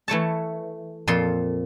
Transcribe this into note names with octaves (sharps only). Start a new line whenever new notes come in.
E3 A3 C#5 A5
F2 A#2 F4 A4 C6